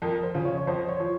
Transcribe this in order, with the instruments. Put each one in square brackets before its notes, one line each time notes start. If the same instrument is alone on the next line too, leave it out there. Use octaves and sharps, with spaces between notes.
[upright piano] F2 [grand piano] A#4
[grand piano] C5
[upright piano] C#3 F3
[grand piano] C#5
C#5
[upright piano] F2 [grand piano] C5
[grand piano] C#5
[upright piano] F3